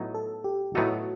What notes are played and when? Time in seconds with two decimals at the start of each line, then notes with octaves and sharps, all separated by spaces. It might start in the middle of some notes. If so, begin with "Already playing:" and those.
Already playing: A2 F#3 B3 D#4
0.15 A4
0.44 G4
0.75 A2 F#3 B3 D#4 F#4 A4